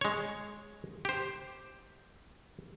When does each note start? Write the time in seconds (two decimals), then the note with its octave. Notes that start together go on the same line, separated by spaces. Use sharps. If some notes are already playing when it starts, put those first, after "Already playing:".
0.01 G#3 C#5
1.05 G4 C5